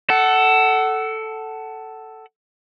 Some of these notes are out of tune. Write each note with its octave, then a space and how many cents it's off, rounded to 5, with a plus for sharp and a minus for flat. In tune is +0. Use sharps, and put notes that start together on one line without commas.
A4 +0 F#5 +25